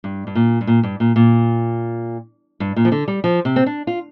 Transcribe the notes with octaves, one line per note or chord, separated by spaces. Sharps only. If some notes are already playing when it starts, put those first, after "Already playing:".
G2
G2
A#2
G2
A#2
G2
A#2
A#2
G2
A#2
F3
D3
G3
F3
C3
C4
D4
F4